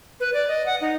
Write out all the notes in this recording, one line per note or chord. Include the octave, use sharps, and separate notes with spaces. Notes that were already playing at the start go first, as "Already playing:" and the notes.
B4
D5
D#5
F#5
D#4